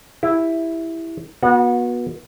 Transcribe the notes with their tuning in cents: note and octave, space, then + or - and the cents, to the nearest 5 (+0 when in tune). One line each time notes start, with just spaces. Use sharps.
E4 +0 G4 +20
B3 -35 F#4 -30 F#5 +0